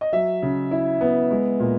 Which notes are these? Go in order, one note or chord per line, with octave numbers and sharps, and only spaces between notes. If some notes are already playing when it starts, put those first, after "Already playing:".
D#5
F#3 E5
C#3
E4
B3
G#3
A#2